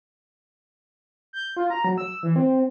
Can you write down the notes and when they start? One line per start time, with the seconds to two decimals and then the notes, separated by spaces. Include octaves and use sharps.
1.33 G6
1.57 F4
1.70 A#5
1.84 F#3
1.98 E6
2.23 E3
2.36 C4